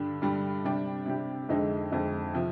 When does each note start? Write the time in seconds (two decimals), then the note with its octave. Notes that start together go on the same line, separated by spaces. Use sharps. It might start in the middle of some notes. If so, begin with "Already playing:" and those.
Already playing: G2 D3 G3 D4
0.22 G2 D3 G3 D4
0.64 C3 G3 D4 G4
1.06 C3 G3 D4 G4
1.49 F2 D3 G#3 D#4
1.92 F2 D3 G#3 D#4
2.34 C3 F3